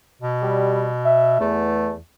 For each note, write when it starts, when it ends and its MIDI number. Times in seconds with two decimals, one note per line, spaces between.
0.21 1.37 47
0.42 0.86 55
1.05 1.39 76
1.40 1.95 40
1.40 1.92 57